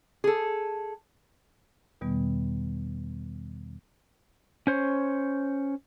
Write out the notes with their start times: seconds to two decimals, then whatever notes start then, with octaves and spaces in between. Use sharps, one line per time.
0.24 G#4 A4
2.01 E2 B2 D#3 G3 B3
4.67 C#4 C5 C#5